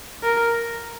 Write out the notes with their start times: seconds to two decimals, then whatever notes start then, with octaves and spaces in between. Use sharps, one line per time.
0.23 A#4